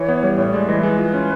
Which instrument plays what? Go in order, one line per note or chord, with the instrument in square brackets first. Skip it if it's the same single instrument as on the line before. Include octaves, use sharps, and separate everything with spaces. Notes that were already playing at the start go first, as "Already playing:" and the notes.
Already playing: [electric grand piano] E3 [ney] C#5
[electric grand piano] B3
G3
[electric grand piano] A2 [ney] C#5
[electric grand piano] G#3 [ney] D5
[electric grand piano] E3 [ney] D#5
[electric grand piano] G#3 [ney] B4
[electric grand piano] F4
C#4